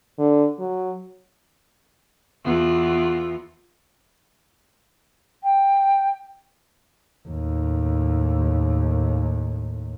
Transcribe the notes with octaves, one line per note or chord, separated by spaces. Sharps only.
D3
F#3
E2 B3 F4
G5
D#2 A2